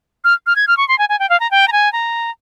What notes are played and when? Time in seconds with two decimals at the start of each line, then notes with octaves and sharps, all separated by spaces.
0.24 F6
0.46 F6
0.56 G#6
0.67 F6
0.77 C#6
0.88 C6
0.99 G#5
1.09 G#5
1.19 G5
1.30 F5
1.40 A#5
1.51 G5
1.68 A#5
1.72 G#5
1.93 A#5